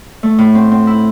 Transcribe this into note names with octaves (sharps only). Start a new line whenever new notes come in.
A3
A2
C4
C4
E4